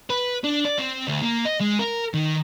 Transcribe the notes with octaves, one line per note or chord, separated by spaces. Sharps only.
B4
D4
D5
C4
D2
A#3
D#5
G#3
A#4
D#3